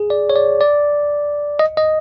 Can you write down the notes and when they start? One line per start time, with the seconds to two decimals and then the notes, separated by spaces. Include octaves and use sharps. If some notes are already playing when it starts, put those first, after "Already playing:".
Already playing: G#4
0.10 D5
0.30 C#5
0.36 D5
0.61 D5
1.59 D#5
1.77 D#5